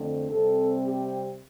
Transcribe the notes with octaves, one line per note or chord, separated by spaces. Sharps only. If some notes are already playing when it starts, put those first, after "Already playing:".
Already playing: F2 D3 A3 C4
C3 G3 C4 A4
G4